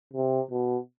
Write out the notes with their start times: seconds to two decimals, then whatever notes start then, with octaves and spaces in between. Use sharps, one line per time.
0.14 C3
0.51 B2